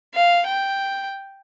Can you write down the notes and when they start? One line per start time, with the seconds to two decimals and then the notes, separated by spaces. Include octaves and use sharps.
0.15 F5
0.47 G5